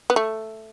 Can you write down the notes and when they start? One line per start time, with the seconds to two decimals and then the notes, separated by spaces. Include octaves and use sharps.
0.10 B3
0.16 A3